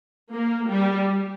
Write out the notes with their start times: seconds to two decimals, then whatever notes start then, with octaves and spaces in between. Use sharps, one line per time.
0.31 A#3
0.69 G3